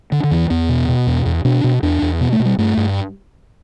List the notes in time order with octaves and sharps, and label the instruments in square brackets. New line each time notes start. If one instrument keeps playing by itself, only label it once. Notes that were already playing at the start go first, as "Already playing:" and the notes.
[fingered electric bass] D3
D3
E2 E3
E2 B3
B2
B2
E2
E2
B2 D4
B2
E2 D4
E2
B2 B3
A3
B2
G3
G2 A3
G2